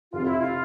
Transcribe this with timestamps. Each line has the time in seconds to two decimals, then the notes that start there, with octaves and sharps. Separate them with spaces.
0.12 F1 F2 C3 F4
0.26 E4
0.40 F4